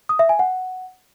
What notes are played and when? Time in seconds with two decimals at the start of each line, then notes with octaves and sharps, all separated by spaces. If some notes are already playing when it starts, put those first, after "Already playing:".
0.09 D#6
0.19 E5
0.29 G#5
0.39 F#5